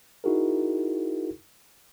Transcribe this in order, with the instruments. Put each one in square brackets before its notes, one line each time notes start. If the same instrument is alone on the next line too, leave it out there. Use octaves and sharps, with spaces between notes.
[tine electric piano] D#4 E4 F#4 G#4 A#4